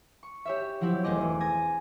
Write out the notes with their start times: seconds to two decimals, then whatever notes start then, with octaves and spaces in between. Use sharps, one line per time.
0.23 C#6
0.45 G4 C#5 E5
0.81 F3 F#3 C4 E4 G4
1.04 E1 A3 G#4 D#5 D6
1.21 E3
1.40 G#5 D#6 G#6 A#6